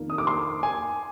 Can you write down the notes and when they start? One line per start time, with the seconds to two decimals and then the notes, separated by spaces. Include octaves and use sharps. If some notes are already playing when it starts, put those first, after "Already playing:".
Already playing: F2 D#3 A#3 D4
0.10 D#6
0.18 D6
0.27 C6
0.63 G#5